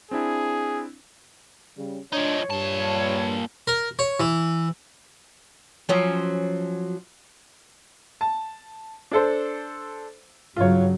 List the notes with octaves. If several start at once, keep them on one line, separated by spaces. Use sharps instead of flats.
C4 D4 E4 G#4
C#3 G3
F3 D4 D#4 C#5
G2 A#2 A5
A#4
C#5
E3
F3 F#3 C#4
A5
D4 A4 C5
G2 C#3 F#3 F4 C#5